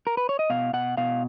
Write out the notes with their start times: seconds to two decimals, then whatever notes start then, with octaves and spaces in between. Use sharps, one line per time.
0.07 A#4
0.17 B4
0.29 C#5
0.39 D#5
0.50 B2 F5
0.73 B2 F#5
0.97 B2 F5